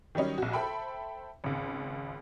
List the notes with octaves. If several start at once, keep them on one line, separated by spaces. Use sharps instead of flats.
D#3 F#3 G3 C#4 D#5
A#1 F#4
A4 C5 E5 G5 B5
G#1 C#2